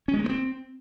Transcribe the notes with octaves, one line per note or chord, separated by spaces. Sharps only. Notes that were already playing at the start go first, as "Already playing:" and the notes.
C#4
G#3
A#3
A3
C4